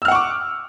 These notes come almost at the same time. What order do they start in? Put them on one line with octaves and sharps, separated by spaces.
E6 F6 F#5 C#6 D6